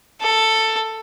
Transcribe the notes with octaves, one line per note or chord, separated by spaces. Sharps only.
A4